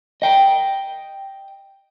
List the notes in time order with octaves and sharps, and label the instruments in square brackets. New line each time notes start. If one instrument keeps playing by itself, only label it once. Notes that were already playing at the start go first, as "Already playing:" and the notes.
[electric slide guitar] D#5 G5